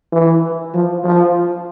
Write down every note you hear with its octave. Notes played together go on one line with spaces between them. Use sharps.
E3
F3
F3